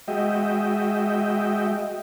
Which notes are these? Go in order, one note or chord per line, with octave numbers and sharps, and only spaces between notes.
G#3 F#4 D#5 E5 G5